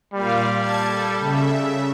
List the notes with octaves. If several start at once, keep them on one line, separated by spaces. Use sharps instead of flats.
A#2 G3 F5
A5 G#6
A4
C#3 E5